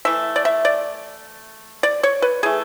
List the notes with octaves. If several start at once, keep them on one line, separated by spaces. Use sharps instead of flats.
E3 A3 E5
D5
E5
D5
D5
C#5
B4
E3 A3 G#4